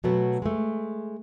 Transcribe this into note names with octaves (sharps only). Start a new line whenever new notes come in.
B2 F#3 A3 B3
G#3 A3